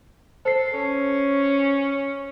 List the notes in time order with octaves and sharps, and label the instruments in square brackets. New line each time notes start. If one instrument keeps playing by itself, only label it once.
[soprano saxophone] A4 [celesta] C5 C7
[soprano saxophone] C#4